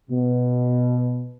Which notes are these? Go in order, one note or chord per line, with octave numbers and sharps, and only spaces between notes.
B2